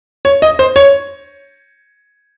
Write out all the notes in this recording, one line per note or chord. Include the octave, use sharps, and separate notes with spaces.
C#5
D#5
C5
C#5